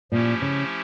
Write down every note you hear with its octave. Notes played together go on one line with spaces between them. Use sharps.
A#2 F3 A3 C#4 E4 G4
C#3